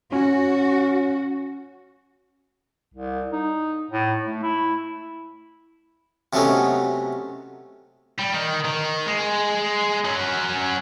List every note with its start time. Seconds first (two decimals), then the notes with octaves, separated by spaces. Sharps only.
0.12 C#4 F#4
2.94 C2
3.33 D#4
3.91 A2
4.26 A3
4.43 E4
6.33 C3 F#3 A3 B3 C#4 D#4
8.19 G3
8.32 D#3
8.65 D#3
9.06 G#3
10.05 F#3 C#4